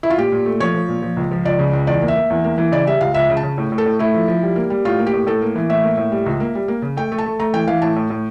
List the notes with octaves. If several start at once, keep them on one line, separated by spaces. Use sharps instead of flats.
E4
F4
A#2 G4
A#2
A3
F3 C#5
F3
A#2
F3
C#2
F3
C#2 D5
C#3
C#2
E2 D5
A#3
E5
A#3
E2
A#3
E3
C#3 D5
G3 E5
C#2 F5
C#2 E5
C#3
A5
C#3
A2
A2
A4
A2
A3 E4
F3
F3
G3
A#3
G3
A2 F4
A#3
G4
A2
A2 A4
A#3
E3
A2 E5
A#3
A2
G3
C#2
A#3
G3
A#3
C#3
A3 G5
A3
A5
A3
A3 A#5
E3 G5
E3 F5
A2 A5
A2
A2